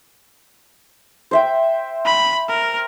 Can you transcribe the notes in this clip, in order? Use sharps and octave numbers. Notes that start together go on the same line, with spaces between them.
C5 E5 G5
B5
A#4